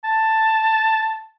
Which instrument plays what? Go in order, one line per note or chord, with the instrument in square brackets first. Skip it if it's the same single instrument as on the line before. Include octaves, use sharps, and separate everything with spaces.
[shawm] A5